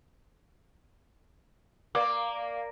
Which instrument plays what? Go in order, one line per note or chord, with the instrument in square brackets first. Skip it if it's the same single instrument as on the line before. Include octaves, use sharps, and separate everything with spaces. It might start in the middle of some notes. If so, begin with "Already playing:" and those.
[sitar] A#3 [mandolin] D5